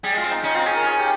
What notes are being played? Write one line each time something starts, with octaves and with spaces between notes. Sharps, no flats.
G3 G#4
G#3 F4
C4
D#4
C#4 D#4
C4 F4
C#4 G#4
A#4
G#4
G4